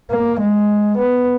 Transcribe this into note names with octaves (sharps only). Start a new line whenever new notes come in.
A#3
G#3
B3